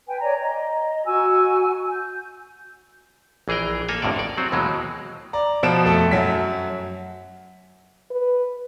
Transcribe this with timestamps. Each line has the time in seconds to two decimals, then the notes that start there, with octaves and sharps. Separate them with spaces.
0.07 B4 G5 G#5
0.21 C#5 D5 G#5 A#5
0.42 D#5 A#5
1.05 F#4 G#5 E6
1.91 G6
3.48 A#1 E3 G#4 A#4 G5
3.88 A#3 A4 G#5 A#5
4.02 G1 F2 A2 C3 D5
4.16 A#4 D5
4.37 F#3 C4 F#4
4.52 D#2 B2 E3 F#3 G#3
5.33 D5 A#5
5.63 B2 F3 D7 E7
5.85 F2 A3 A4
6.11 F#2 F#3 B6
8.11 B4